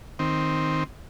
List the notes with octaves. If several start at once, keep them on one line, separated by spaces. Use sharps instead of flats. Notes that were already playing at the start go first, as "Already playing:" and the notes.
D#3 C4